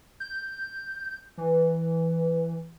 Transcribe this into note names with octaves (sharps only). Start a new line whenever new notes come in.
G6
E3